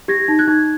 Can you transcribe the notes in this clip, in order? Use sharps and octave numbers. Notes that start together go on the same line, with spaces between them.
G4 G#6 A#6
D#4
F#6 G#6
D#4